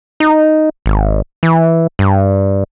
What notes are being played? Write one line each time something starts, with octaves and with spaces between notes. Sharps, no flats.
D#4
G#1
E3
G2